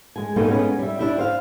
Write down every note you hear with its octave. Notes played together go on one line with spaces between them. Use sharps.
G#3 G#5
G3 G#3 A#3 B3 D#4 A4
G#3 B3 C#4 D#4 B4
G3 E5
D4 E4 G4
C5 F5